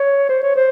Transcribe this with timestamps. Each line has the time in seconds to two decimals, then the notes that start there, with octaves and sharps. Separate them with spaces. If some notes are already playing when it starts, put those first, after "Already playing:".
Already playing: C#5
0.29 C5
0.43 C#5
0.56 C5